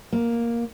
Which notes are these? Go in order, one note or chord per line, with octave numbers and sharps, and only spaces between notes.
A#3